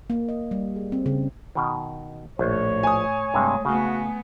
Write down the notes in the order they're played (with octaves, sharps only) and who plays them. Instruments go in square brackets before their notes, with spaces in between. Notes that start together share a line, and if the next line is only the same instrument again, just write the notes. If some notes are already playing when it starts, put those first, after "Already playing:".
[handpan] A#3
D#5
G3
G#4
C4
C#3
[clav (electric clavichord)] B2 D#3
[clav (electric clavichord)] A#1 [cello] A2 [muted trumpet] C#5
[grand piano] G#5 D#6
[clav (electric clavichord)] G2 C3 [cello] G#3 A3
[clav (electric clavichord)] C#3 [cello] A3 B3 [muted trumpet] F#4